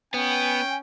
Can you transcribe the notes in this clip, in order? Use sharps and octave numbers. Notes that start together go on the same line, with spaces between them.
B3 C#4 G5 G#5